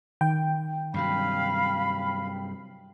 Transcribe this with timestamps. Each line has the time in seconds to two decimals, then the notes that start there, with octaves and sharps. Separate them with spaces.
0.21 D#3 G5
0.94 G2 C3 F#3 F5 B5